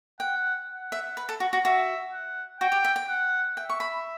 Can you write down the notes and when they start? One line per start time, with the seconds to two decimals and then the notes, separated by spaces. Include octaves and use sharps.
0.20 F#5 G5
0.69 F#5
0.92 E5
1.17 B4
1.29 A4
1.40 F#4
1.53 F#4
1.65 F#4 E5
2.12 F#5
2.60 F#4 G5
2.72 G4
2.84 E5
2.96 G5
3.09 F#5
3.56 E5 G5
3.69 C#6
3.80 B5